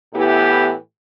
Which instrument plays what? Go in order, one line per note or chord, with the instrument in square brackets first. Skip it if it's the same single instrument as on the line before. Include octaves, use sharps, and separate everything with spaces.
[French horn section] A2 E3 B3 E4 G4